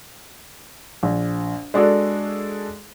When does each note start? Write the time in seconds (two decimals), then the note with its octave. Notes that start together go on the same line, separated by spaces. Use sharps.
1.03 A#1
1.74 G#3 D4 F#4 G#4 A4 D5